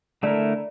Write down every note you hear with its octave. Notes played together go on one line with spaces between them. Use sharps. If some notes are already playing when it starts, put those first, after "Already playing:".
D3 A3 E4 A#4 D5